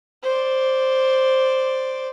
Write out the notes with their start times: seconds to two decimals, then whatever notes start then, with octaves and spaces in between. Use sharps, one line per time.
0.23 C5 D5